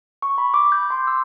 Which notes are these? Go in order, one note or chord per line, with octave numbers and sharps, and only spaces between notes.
C#6
B5
D6
G6
C6
E6